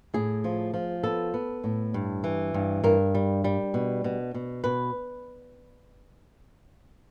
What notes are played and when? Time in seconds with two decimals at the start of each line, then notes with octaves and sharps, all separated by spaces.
0.14 A2 G#4
0.44 F3
0.74 F3
1.04 B3 A4
1.34 B3
1.64 A2
1.94 G2
2.24 E3
2.54 G2
2.84 G2 A#4
3.15 G3
3.44 G3
3.74 B2
4.04 B2
4.34 B2
4.64 B2 B4